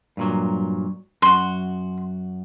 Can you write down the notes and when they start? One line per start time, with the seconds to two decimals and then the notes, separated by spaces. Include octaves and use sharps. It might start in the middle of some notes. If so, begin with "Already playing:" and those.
0.17 G2 A#2 F#3
1.22 F#2 F#4 C6